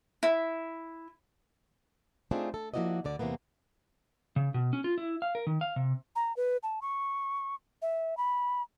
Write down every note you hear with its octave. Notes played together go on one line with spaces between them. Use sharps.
E4
A3 C4 D4 D#4 F4 G#4
A4
F3 A#3 E4 F#4 D5 D#5
D2 D3 D5
E2 C3 E3 A#3 B3
C#3
B2
C#4
F4
E4
F5
A#4
D#3
F5
C3
A#5
B4
A5
C#6
E5
B5